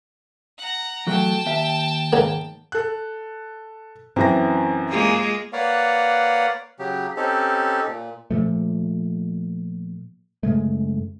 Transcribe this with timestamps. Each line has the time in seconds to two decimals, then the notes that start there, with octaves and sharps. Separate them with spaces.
0.58 F#5 A#5
1.07 E2 F#3 A3 G5 A5
1.46 D#2 E5
2.13 G#2 C#3 A#3
2.72 A4 F#6
4.16 F#2 E3 C4 A#6
4.89 G#3 A#3 F4
5.53 A#3 B4 C#5 D5 F5 F#5
6.79 C#3 F#3 G4
7.17 C4 C#4 D#4 G4 A4
7.88 A#2
8.31 A#2 F3 A3
10.43 F#2 C#3 G#3 A3